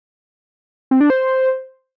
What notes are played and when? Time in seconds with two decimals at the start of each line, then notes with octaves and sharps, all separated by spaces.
0.91 C4
1.01 D4
1.10 C5